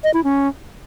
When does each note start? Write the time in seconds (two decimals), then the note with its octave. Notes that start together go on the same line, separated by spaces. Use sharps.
0.04 D#5
0.14 E4
0.24 C#4